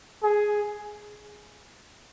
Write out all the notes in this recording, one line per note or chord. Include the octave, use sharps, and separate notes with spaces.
G#4